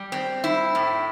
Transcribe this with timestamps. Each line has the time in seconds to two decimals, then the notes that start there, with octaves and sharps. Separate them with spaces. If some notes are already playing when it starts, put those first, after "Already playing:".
Already playing: G3
0.12 C4
0.44 E4
0.75 A2